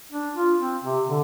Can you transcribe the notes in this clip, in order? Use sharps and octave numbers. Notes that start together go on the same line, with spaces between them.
D4
F4
C4
C3
D3